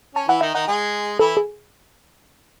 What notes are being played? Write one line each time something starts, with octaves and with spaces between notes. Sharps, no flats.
C#4 A5
E3 E4 F#5
D#3 D#4 E5
D#3 D#4 F#5
G#3 G#4
E3 E4 A4
G#4